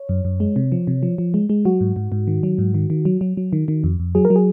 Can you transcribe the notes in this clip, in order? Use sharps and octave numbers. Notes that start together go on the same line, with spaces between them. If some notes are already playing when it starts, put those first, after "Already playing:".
Already playing: C#5
F#2
F#2
G#3
C3
F3
C3
F3
F3
G#3
G#3
F#3 F#4
G#2
G#2
G#2
D#3
F#3
G#2
D#3
D#3
F#3
F#3
F#3
D#3
D#3
F2
F2
F#3 G#4
A#4
F#3
G#4